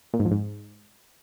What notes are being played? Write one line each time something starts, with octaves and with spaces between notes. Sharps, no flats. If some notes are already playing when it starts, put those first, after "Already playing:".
A#2
G#2
F2
G#2